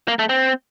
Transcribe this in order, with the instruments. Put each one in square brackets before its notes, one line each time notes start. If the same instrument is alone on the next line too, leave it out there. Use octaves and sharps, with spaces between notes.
[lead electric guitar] A#3
A3
C4